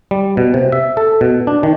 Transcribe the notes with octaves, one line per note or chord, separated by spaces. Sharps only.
G3
B2
C3
E5
A4
B2
D4
D#3